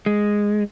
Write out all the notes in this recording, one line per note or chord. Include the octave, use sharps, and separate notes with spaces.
G#3